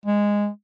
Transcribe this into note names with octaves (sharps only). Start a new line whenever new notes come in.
G#3